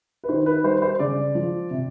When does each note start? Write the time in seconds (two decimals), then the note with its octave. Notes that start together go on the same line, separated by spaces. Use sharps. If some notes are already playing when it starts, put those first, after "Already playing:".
0.24 B4
0.29 D#3 C5
0.46 B4
0.64 G3 C5
0.82 C5
0.99 C#3 D5
1.35 F3
1.71 C3